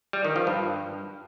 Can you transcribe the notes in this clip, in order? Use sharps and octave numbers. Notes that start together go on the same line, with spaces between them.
G3
D#3
F3
G2